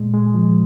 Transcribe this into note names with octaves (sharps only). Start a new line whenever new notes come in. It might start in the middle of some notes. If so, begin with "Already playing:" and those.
Already playing: A#2 G#3
G#3
F3